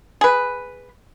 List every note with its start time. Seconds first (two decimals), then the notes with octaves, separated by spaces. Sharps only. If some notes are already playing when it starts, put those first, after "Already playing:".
0.21 G#4 B4